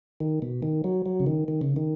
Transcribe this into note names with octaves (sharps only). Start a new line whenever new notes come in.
D#3
B2
D#3
F#3
F#3
C#3
D#3
D#3
C#3
D#3